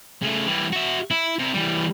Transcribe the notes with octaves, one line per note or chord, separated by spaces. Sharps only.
C#3 A3
E3 G3
F#4 E5
E4
C3 E4
E3 G3